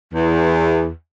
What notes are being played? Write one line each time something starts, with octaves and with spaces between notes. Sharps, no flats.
E2